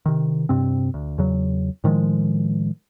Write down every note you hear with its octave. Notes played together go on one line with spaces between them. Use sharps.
C3 D#3
G2 C3 C4
D2
E2 C#3 F#3
A2 D#3 F3 G#3